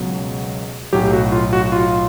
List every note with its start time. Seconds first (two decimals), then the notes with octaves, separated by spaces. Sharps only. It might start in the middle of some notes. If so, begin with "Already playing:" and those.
Already playing: C#2 B2 F#3
0.93 B1 A2 F#3 G4
1.13 F#4
1.32 F4
1.53 F#4
1.72 F4